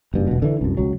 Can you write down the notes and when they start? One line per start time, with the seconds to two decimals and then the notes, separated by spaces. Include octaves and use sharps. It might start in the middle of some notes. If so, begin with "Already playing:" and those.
0.14 F#1 G2
0.27 E1 B2
0.42 D3 E3
0.61 C2 F#2
0.77 C#2 F#3